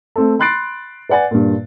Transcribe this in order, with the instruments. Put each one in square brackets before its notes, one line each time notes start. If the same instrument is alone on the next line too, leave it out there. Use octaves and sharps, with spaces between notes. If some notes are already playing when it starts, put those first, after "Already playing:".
[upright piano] A3 C4 A4
B5 C6 F#6 A6 C7 D7
B4 D5 F#5 G#5 A6
G2 A#2